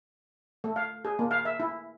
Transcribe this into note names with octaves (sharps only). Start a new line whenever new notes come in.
A3
F5
G#4
A#3
F5
E5
E4